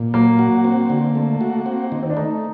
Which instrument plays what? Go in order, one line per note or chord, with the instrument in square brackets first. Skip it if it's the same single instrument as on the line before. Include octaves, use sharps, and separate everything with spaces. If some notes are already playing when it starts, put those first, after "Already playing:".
Already playing: [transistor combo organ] A#2
[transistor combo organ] F#3 [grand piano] A#3
[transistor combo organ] F#4
C4
D3
A3
F#4
C4
D#3
[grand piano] C4
D4
[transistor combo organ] A3 [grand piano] D#4